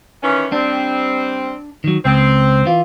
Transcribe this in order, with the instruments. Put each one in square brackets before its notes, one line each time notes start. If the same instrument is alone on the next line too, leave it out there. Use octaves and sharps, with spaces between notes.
[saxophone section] D#3 E3 C#4
[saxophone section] G3 C4 [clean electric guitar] D4
[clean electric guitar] D#3 F#3
[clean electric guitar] C#2 [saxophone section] C4
[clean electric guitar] E3 F4